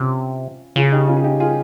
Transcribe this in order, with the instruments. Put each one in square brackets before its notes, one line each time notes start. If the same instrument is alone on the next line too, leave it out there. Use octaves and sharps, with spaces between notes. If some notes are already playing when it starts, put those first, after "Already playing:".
Already playing: [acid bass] C3 [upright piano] C#4 F4
[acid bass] C#3 [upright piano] F4 G#4
[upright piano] D#4 G4
C#4 F4
G#4
D#4 G4
F4 G#4